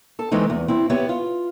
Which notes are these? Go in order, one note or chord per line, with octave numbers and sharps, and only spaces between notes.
A4 A5
E3 G#3 A3 C4 D#4
E2
C4 E4
B3 G4 C#5 E5
F4